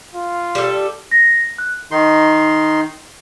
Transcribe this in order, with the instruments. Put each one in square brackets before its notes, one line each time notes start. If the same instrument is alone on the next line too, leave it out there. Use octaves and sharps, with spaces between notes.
[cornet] F4
[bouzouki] G3 A4
[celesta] A#6
F#6
[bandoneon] D#3 D#4 C6